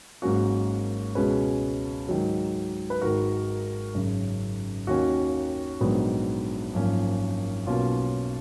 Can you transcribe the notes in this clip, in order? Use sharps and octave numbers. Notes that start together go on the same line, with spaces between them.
G#1 G#2 F#3 A#3 C#4 F#4 A#4
C#2 B2 G#3 C#4 G#4 B4
G#2 D#3 F#3
B4
G#1 G#2 D#3 F#4 A#4
G#1 F#2 C#3
D#2 D#3 A#3 C#4 F#4
A#1 G#2 D#3 F#3 B3
G#1 F#2 F3 A#3 C#4
B1 B2 A#3 C#4 F4